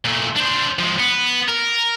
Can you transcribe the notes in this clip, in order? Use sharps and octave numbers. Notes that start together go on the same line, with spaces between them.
A#2 A3
D4 C5
F3 G#3
B3
A#4